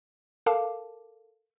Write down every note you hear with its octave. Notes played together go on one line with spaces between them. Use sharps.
A4 A#4 F5 A5 D6